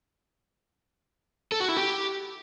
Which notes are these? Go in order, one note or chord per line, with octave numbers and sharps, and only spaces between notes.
A4
F#4
E4
G4